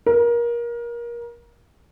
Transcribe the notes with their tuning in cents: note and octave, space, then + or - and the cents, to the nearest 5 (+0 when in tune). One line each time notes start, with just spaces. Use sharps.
A#4 +25